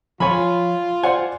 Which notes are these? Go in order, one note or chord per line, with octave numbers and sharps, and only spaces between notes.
F3 F4 C#5 G#5 B5
C5 D5 F#5 G#5